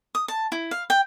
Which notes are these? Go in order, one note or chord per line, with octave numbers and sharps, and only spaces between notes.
D#6
A5
E4
F5
G5